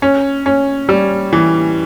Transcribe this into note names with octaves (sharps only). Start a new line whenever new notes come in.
C#4
C#4
G3
E3